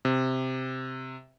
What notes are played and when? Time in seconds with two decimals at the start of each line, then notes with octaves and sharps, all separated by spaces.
0.05 C3